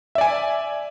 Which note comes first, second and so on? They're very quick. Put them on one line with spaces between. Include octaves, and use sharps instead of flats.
E5 D5 G#5